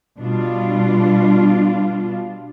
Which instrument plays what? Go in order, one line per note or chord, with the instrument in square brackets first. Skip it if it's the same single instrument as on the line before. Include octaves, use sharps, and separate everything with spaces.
[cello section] B2 G3 D4 F4